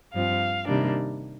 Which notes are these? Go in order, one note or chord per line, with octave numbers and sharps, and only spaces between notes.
G2 F3 C4 F5
C3 D#3 G3 A#3 D4